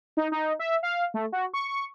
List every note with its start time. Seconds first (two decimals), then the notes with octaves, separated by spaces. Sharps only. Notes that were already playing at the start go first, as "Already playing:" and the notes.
0.17 D#4
0.32 D#4
0.59 E5
0.83 F5
1.14 A3
1.32 F#4
1.54 C#6
1.68 C#6